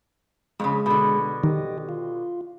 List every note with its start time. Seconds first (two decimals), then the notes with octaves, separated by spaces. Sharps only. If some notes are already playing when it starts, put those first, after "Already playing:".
0.60 F2 A2 C#3 G#3
0.86 B2 D3
1.44 D#3 G4 D#5
1.89 F4